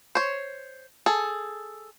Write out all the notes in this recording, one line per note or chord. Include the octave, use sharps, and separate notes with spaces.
C5 C#5
G#4 A4